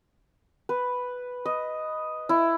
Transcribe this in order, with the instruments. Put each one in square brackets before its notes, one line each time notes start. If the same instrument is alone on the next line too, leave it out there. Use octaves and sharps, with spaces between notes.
[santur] B4
D#5
E4